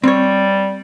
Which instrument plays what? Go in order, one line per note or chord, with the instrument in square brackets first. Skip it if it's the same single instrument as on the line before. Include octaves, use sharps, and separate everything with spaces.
[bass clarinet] G3 [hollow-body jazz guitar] C4 C#5